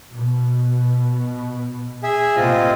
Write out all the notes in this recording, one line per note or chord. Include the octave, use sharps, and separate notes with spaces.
B2
G#4 E5 G#5
A2 C3 A#3 C4 F4 D#5